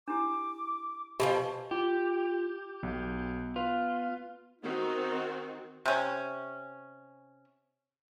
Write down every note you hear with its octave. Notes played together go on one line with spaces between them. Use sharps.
D4 E4 G4 D6
B2 D#3 F3 G4 D#5 G#5 A5 B5
F4 G4
B1 B3
F4 B4
D#3 C4 D#4 F#4
C3 C#4